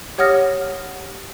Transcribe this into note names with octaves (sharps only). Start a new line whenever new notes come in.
G4 C#5 F#5 D#6 F6 A#6